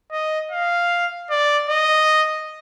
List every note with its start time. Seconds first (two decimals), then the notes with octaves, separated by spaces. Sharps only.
0.12 D#5
0.51 F5
1.30 D5
1.70 D#5